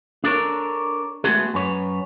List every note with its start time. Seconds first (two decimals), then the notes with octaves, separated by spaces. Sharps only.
0.24 D4 A4 A#4 C#5
1.24 G#3 A3 B3 D4 F#4 G#4
1.54 F#2 B4 C#5